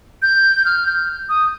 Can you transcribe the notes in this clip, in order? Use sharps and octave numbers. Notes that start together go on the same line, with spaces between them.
G6
F6
G6
D#6